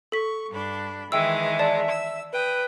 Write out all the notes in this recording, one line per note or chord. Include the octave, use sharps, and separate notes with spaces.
A4 C#6 B6
G2 D4 B5
D#3 E3 G#3 E5 G5 E6
D5 A5
E6
B4 G5 D#6